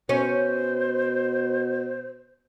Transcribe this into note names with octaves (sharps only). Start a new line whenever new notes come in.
B2 C#4 C5